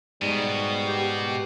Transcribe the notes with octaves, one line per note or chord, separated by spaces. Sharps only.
G#2 B2 G3
G4